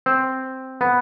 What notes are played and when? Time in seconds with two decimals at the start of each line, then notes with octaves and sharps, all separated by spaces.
0.06 C4
0.81 B3